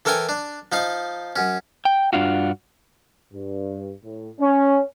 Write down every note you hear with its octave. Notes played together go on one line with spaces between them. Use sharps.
E3 A4 A#4 C#5 G5 G#5
D4
F3 D#4 F5
F#2 C#4
G5
G2 D4 F4 F#4
G2
A2
C#4